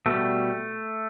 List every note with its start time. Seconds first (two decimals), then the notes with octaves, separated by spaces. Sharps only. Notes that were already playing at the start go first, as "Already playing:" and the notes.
0.06 B2 G3 A3